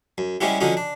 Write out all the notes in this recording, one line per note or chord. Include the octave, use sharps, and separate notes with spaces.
F#2
G3 G#3 B3 C#4 E4 G4
D3 F3 F#3 C#4 D#4
D4